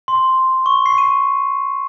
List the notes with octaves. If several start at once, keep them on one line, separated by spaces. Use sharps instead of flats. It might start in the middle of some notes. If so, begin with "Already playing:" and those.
C6
C#6
C7
D#7